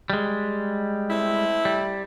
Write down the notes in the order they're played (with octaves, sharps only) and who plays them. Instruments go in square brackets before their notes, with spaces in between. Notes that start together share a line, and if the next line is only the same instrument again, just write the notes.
[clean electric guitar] G3 G#3
[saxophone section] A3 C4 E4
[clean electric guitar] G3